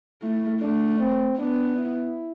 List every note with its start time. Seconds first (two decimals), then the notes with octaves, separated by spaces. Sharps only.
0.22 A3 E4
0.61 A3 D4
1.00 C4
1.38 B3 D4
1.76 E4